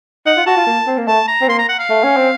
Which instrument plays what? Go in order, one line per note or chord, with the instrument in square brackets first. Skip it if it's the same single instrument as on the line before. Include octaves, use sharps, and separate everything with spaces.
[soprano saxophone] D#4 [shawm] F#5
[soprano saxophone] F4
[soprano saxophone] F#4 [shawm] A5
[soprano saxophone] F4
A#3
C4
A#3
[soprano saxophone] A3 [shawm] A5
[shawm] A#5
[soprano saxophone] C4
[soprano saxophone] A#3 [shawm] C6
[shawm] A#5
F#5
F5
[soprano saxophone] A3
C#4
C4